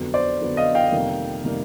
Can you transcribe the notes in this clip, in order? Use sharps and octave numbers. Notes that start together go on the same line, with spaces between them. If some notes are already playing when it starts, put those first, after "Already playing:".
Already playing: F2 D3 F#3 B3
C5 D5
F2 D3 F#3 B3
D#5 F5
F5 G5
F2 C3 D#3 G3 A#3
C3 D#3 G3 A#3